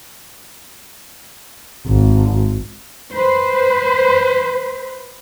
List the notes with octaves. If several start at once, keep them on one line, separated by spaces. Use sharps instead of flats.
G#1
B4 C5